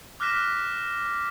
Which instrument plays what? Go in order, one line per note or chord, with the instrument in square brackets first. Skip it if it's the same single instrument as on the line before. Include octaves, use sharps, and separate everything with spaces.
[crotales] D6 F6 F#6 A#6 B6 E7